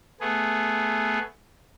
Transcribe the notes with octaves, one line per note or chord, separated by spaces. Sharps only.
A3 B3 G#4